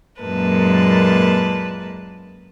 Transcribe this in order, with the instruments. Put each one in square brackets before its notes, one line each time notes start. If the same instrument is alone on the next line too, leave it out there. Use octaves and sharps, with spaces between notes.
[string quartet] F#2 A#2 G#3 A#3 B4 A5